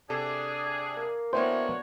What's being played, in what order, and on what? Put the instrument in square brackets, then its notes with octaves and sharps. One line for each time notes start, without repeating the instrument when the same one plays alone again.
[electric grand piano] C3 A4 [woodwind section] D4 G#4
[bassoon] A#3
[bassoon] E3 [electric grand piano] A#3 B3 G5 [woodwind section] D4 F#4 C#5 [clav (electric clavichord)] C5